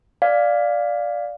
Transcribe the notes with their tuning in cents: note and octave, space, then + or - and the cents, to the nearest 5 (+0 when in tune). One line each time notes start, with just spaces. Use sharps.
D5 +0 F5 +5